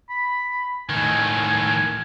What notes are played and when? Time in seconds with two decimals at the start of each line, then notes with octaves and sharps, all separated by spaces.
0.10 B5
0.89 A2 D#3 G#5